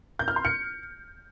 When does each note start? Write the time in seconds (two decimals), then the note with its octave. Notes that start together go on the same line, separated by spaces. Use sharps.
0.19 G6
0.28 F6
0.36 C6
0.45 C#7